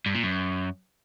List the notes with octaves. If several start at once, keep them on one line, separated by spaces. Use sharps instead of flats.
G2
A#2
F#2